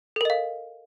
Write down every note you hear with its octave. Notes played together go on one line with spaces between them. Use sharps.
A4 A#4 D#5 F5